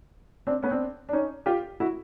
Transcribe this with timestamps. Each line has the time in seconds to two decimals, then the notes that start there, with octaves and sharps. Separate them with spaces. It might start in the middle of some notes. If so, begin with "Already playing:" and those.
0.47 C4 D4
0.62 B3 C#4
0.71 C4 D4
1.09 D4
1.13 C#4 D#4
1.46 F4 G4
1.80 E4 F#4